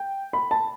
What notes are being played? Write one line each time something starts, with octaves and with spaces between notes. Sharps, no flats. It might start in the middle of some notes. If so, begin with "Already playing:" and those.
Already playing: G5
B5
A5